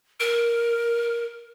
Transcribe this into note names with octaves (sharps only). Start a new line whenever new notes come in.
A#4